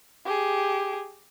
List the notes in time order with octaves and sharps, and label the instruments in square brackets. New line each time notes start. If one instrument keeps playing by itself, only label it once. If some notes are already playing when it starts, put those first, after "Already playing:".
[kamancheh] G4 G#4